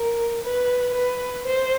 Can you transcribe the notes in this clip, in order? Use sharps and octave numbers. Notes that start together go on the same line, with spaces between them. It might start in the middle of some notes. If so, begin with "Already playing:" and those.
Already playing: A#4
B4
B4
C5